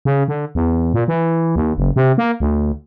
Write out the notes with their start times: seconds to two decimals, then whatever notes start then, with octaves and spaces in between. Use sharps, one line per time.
0.05 C#3
0.28 D3
0.55 E2
0.94 A#2
1.08 E3
1.56 D#2
1.78 F#1
1.96 C3
2.18 A#3
2.40 D2